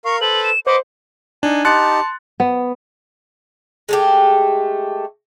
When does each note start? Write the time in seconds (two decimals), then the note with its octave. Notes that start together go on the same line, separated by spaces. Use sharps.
0.05 A#4 F5 C#6
0.21 A4 B4 C5 F#7
0.44 E7
0.67 B4 C5 D#5 F#5 D6
1.43 D4 D#4 G#5
1.65 D#4 G4 A5 C6 F#6 A6 C#7
2.40 B3
3.89 G#3 A3 G4